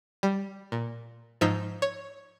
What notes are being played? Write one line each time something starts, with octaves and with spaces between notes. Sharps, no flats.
G3
A#2
G#2 F3 D#4 E6 G6 B6
C#5